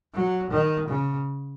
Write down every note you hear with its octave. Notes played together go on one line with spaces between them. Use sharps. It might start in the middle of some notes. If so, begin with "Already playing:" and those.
F#3
D#3
C#3